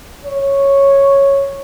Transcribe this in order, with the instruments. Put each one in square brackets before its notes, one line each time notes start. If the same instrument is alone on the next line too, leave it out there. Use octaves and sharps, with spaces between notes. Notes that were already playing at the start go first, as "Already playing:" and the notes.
[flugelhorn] C#5